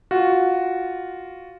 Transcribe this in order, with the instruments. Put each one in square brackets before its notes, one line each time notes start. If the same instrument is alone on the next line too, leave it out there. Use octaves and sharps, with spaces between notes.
[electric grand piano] F4 F#4